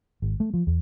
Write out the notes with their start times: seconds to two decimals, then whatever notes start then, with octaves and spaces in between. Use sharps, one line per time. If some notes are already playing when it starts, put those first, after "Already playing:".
0.22 G#1
0.40 A3
0.54 F3
0.67 E2